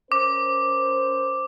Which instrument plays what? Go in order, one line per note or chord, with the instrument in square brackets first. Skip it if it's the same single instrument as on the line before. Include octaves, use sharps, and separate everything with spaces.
[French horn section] C#4 A#4 C5 [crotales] D6